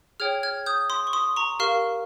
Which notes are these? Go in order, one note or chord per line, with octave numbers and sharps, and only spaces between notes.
G#4 C#5 G5 F6 G#6
F6 G#6
D#6 G6
C6 D#6
C#6
C6 D#6
A#5 C#6
G4 A#4 F5 C#6 F6